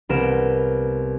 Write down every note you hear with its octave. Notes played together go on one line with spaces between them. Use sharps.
C2 B3 A#4 D7 E7